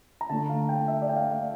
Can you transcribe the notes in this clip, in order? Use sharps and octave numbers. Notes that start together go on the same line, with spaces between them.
A#5
D3 A3 D4 A5
F5
G5
E5
D5
G5
F5
F5